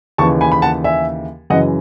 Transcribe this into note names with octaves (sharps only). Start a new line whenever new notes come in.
D#2 C#3 E3 A5 C#6
G#5 B5
B5
F#5 A5
E5 G#5
F#2 C#3 E3 D#5 F#5